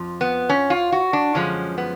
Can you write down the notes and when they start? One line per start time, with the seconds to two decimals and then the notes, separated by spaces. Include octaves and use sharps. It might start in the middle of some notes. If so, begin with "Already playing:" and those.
Already playing: F2 F3
0.21 B3
0.49 C#4
0.70 F4
0.92 F#4
1.13 D4
1.34 F#2 D3 F3 G#3 C#4
1.78 B3